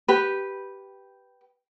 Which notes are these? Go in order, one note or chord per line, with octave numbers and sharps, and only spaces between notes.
G4 B4